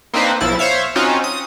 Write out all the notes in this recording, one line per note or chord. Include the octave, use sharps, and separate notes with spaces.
A#3 C4 D4 D#4 B4 C5
B1 F3 E4 A6
C5 C#5 E5 F5
C4 C#4 D#4 F4 F#4
D#6